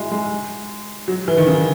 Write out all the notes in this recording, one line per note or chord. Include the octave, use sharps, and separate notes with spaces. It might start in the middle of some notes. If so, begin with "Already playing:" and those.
Already playing: G#3 E4 F#4
G#3
F#3
E3
D#3
C#3